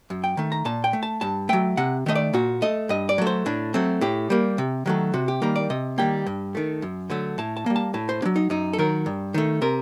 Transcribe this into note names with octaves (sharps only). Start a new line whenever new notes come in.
F#2
G5
D#3 A3
A#5
A#2 A5
G5
A3
A5
G2 A5
F#3 A3 G5
C3 F#5
D#3 A3 D#5
D5
A#2 F#4
A3 D#5
G2 D#5
D5
F#3 A3
C5
A2 D4
F#3 A3 C4
A2 G4
G3 A#3
C3
D#3 F#3 A3
C3 F#4
G4
D#3 G3 A#3 A#4
D5
C3 D#5
D#3 G3 A#3 G5
G2
D#3 A3
F#2
D3 F#3 A3
A2 A5
A5
G3 A#3
A5
A2 A5
C5
F#3 A#3 D4
D#4
F#2 D#4
A4
D#3 F#3 A#4
G2
D#3 A3
C3 A#4